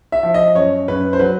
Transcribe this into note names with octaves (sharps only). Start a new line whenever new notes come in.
E5
F3
D#5
F#2 C#5
F#2 B4
C5
F#3 B4